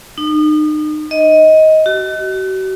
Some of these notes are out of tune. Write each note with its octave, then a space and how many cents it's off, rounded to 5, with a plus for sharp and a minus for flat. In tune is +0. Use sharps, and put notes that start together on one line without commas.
D#4 -35
D#5 +15
F#4 +40